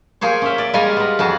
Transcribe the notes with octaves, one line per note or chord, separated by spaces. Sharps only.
A#3 G#4 C5 C#5
C#4 E5
D5
G3 G#3 F4 G#5 A#5 C6
B3 A#5
F2 F#4 G#4 A5